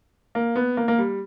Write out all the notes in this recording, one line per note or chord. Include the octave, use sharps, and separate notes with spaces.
A#3
B3
A#3
A#3
G3